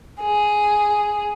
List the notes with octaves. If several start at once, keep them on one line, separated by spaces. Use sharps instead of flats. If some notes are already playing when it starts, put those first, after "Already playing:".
G#4